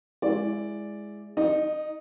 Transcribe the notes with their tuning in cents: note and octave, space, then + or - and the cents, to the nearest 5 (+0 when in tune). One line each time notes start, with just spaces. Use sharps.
G#3 +0 E4 +0 D5 +0
D#4 +0 D#5 -30